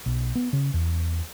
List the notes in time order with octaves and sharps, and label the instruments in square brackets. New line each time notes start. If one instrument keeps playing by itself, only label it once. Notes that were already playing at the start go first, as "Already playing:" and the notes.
[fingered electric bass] B1
B3
C#3
E2